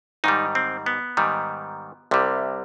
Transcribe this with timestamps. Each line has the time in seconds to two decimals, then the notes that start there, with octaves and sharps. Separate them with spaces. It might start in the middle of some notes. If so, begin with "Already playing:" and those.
0.24 G#2 D#3 G3 D#4
0.55 C4
0.86 B3
1.17 G#2 D#3 G3
2.11 C2 C3 G3